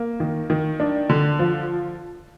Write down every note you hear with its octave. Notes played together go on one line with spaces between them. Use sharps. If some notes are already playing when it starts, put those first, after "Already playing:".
Already playing: A#3
D#3
D#3
D4
D3
F3